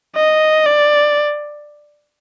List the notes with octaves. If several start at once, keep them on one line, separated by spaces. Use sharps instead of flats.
D#5
D5